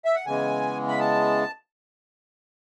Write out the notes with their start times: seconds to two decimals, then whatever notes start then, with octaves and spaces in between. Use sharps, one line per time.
0.05 E5
0.15 F#5
0.26 C#3 E3 G#3 B3 G#5
0.88 B5
1.00 A5